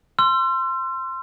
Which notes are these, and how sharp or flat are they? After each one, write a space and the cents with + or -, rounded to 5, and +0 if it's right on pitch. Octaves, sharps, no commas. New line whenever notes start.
C6 +0 E6 +45